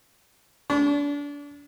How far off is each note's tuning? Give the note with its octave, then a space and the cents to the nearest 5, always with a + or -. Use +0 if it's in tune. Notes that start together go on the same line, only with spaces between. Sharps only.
D4 -30